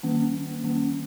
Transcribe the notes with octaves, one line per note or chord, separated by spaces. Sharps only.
D#3 A#3 C#4
D#3 A#3 C#4